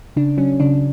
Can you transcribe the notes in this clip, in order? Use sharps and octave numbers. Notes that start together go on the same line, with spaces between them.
C#3 D4
F#3 C#4
C#3 D4